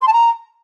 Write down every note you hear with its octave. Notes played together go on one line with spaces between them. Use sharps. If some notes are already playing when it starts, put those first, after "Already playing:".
C6
A5
A#5